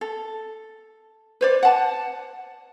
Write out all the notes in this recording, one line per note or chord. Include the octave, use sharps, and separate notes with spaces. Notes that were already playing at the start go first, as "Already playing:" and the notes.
A4
B4 C5 D5
F#5 A5